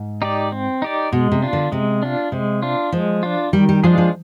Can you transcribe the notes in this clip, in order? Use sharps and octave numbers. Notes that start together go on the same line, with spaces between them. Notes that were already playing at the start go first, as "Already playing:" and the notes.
Already playing: G#2
D#4 G4 D5
C4
D#4 G4 D5
B2 G#3
C3
D4 F4
D3
C3 G#3
D4 F4
C3 G#3
D4 F4
F3 G#3
D4 F4
D#3 G3
G3
F3 G#3 D4 F4 G#4
F3